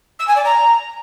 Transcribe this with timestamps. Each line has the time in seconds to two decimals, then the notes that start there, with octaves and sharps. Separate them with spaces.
0.19 E6
0.27 G#5
0.36 D5
0.44 A#5